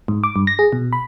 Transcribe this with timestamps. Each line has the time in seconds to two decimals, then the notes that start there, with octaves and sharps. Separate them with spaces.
0.08 G#2
0.24 D6
0.36 G2
0.47 A#6
0.59 G#4
0.72 B2
0.93 B5